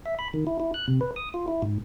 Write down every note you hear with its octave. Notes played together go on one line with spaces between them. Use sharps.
E5
B5
D#3
E4
E4
F#6
C3
B4
D#6
F4
E4
G#2